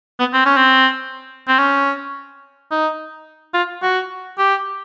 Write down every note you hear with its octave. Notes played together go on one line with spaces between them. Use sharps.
B3
C4
C#4
C4
C4
C#4
D#4
F4
F#4
G4